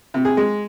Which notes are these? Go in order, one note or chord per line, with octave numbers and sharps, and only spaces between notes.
C3
G#4
G#3